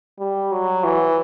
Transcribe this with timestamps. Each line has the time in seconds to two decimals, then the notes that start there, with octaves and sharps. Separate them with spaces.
0.19 G3
0.52 F#3
0.84 E3